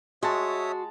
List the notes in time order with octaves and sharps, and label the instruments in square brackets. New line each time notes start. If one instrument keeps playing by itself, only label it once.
[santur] G#3 A5 [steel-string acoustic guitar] F#4 [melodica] C#5 E5 D#6